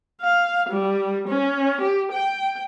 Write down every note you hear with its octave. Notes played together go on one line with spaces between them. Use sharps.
F5
G3
C#4
G4
G5